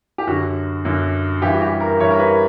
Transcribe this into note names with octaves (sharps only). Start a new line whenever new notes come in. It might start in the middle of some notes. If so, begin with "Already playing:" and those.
G4
F#2 D3 F#3 F#4
F#2 D3 F#3
G2 E3 G3 G4
F#4
G4
A#4
G2 E3 G3 C#5
A#4
B4